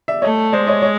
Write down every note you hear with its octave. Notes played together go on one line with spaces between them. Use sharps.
D5 E5
A3 C#5 D#5
G#3 C5 D5
C#5 D#5
C#5 D#5